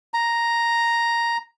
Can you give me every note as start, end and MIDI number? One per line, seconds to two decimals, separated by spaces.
0.14 1.37 82